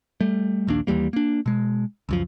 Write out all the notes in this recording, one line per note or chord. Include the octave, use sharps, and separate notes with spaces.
G3 A3
A#1 D#2 A#3 D4
D#2 E3 G3 A#3
A#3 D4
B2 G#3
C#2 F#2 F3